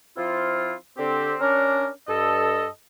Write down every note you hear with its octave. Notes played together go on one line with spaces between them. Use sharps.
F3 C4 E4 F4
D3 C4 G4
C#4 D4 A#4
G2 A4 D#5